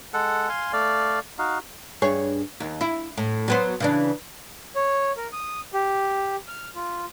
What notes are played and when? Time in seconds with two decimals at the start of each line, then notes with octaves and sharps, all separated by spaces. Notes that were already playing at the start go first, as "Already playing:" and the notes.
0.14 G#3 A4 F#5
0.49 F5 G#5 C6
0.73 A3 D5 F5
1.38 D#4 F#4 F5
2.02 G2 G#4 C#5
2.60 D#2
2.81 E4
3.18 A2
3.48 F#3 B3 C5
3.80 C#3 E3 D4
4.75 C#5
5.17 A#4
5.33 D#6
5.74 G4
6.48 F6
6.75 F4